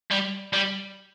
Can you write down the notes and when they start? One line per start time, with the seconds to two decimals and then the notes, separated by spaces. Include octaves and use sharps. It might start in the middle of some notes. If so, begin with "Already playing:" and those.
0.11 G3
0.53 G3